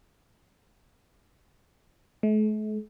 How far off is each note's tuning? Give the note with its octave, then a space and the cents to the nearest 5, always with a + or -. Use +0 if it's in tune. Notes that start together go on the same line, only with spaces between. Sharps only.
A3 -45